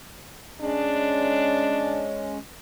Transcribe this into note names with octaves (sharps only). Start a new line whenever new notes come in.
G#3 C#4 D4